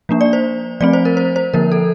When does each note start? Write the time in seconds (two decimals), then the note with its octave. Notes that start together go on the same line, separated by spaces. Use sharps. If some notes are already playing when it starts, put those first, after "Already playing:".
0.09 F3 A#3 D4
0.21 D5
0.33 C5
0.81 F3 A3 C4 D5
0.93 C5
1.05 A#4
1.17 C5
1.36 C5
1.54 D3 F3 A#3 A#4
1.72 A4